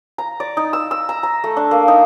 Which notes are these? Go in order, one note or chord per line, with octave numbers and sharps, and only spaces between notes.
A#5
D5
D#4
E6
E6
A#5
A#5
A3
D4
A#3
D#4